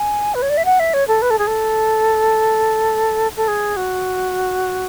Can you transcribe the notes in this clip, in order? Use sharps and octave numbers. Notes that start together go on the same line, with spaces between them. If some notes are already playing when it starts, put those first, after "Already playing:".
Already playing: G#5
B4
C#5
D5
E5
F#5
E5
C#5
A4
B4
A4
G#4
A4
A4
G#4
F#4